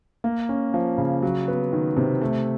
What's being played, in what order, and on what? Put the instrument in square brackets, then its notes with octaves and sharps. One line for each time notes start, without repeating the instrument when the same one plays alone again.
[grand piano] A#3
C#4
F3
C#3
F#3
B3
D#3
C3
A3